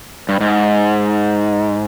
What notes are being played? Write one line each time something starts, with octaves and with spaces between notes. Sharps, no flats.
G2
G#2